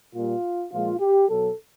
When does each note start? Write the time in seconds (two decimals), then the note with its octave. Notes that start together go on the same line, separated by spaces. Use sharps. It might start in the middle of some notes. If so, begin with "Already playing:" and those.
0.13 A#2 G3 F4
0.72 A#2 F3 G#3 F4
1.00 G4
1.29 B2 F#3 A4